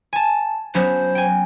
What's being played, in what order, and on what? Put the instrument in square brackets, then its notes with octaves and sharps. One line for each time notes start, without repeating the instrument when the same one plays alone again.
[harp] G#5 A5
[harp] F#3 B3 C#4 [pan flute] C5
[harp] G5 G#5